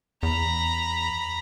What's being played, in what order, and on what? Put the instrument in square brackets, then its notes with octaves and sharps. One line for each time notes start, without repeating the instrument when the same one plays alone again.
[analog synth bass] E2 [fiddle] A#5 B5